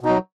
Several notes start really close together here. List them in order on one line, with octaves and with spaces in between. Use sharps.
B2 D#4 F#3